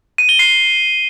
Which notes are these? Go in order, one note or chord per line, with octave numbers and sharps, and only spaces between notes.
D#7
G7
C7